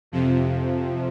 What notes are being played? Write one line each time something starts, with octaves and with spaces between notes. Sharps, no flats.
F2 C3 F3